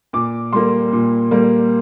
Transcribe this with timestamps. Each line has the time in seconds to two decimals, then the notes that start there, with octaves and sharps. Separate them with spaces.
0.13 A#2 D6
0.53 G3 A#3 C6
0.92 A#2
1.31 G3 A#3